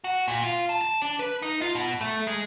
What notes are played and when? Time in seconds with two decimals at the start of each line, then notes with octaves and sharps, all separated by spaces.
0.04 F#4
0.28 A#2
0.43 F4
0.69 A5
0.81 A5
1.02 D4
1.19 B4
1.42 D#4
1.62 F4
1.75 B2
2.01 A3
2.27 G#3